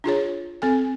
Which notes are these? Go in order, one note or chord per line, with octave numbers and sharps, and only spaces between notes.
D4 F4 G#4 C#5
C4 A4 G#5